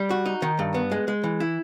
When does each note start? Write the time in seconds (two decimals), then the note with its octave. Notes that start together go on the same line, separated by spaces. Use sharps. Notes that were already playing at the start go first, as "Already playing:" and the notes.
Already playing: G3
0.10 F#4
0.26 D#4
0.42 D#3
0.59 G2
0.74 B3
0.91 G#3
1.08 G#3
1.24 E3
1.40 E4